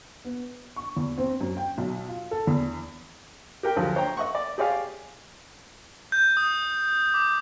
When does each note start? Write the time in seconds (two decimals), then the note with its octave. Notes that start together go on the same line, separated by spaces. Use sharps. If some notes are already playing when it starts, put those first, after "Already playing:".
0.25 B3
0.76 C#6
0.96 E2
1.18 C4
1.41 F#2
1.57 G5
1.78 B1
2.09 F4
2.31 A4
2.47 E2
3.63 G4 A#4 G5
3.76 D2 F3 F#3
3.95 C5 C#5 G5 A#5
4.17 D#5 E5 F#5 C#6
4.35 D5
4.58 G4 G#4 C#5 D5 F5
6.12 G6
6.37 D#6
7.14 D6